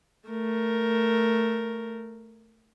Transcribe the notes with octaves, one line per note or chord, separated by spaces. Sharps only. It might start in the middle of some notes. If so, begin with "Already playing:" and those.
A3 A#4